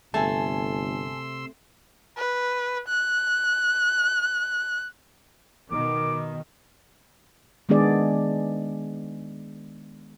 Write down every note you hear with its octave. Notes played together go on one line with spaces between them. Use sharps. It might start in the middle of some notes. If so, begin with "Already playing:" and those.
G1 C3 A3 G#5 A5 C6 E6
B4
F#6
B2 D#3 D6
D#3 G#3 B3 D4 G#4 D5